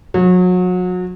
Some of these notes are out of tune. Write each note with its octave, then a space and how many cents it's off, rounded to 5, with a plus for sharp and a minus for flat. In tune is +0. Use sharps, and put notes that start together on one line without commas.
F#3 -30